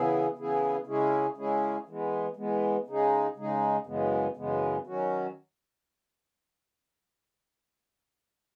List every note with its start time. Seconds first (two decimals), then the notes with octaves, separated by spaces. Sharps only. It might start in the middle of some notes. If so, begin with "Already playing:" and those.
Already playing: C#3 E3 B3 E4 G#4
0.37 C#3 E3 B3 E4 G#4
0.86 C#3 G#3 C#4 E4 G#4
1.37 C#3 G#3 C#4 E4 G#4
1.87 E3 G#3 B3
2.36 E3 G#3 B3
2.87 C#3 G#3 D#4 G#4
3.37 C#3 G#3 D#4 G#4
3.86 F#2 C#3 E3 G#3 B3
4.37 F#2 C#3 E3 G#3 B3
4.87 D#3 F#3 C#4 F#4